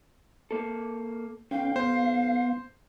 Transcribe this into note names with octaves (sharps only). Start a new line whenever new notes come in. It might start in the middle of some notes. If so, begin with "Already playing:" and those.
A#3 A4
B1 C#4 F5 G5 G6
B3 C5